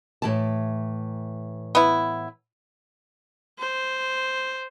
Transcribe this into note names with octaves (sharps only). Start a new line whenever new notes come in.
A2 E3 A5
B3 E4
C5